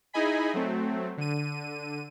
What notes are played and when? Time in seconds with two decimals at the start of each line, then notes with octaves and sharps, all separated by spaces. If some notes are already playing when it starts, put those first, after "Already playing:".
0.13 D#4 E4 G#4 D#5 G#5 B5
0.54 F#3 A3 C4
1.17 D3 D#7